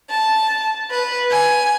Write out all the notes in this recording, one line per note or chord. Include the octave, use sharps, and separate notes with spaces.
A5
B4
G#5